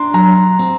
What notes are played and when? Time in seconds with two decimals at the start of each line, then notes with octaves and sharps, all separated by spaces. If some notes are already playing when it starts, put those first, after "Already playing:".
Already playing: D4 A#5 C6
0.14 F#3 A#5
0.59 C4